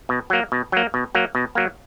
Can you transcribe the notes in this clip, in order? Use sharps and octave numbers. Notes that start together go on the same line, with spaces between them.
B2
F#3 A#3
B2
F#3 A#3
B2
F#3 A#3
B2
F#3 A#3